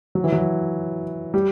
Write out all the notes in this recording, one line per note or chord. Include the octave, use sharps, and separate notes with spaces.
F#3
E3
F#3
G3